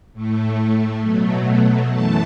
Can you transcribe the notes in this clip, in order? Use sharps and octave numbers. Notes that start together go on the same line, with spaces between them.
A2 A3
B2 F#3 A3
F#2 E3 A3 A5